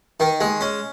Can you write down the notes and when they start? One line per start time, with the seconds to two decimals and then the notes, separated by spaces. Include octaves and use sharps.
0.20 D#3
0.41 G#3
0.61 C#4